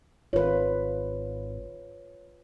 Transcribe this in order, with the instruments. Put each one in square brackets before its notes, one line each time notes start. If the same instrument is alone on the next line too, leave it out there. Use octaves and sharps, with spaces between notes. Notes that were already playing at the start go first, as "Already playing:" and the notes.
[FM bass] G#1 [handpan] F4 B4 [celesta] C#5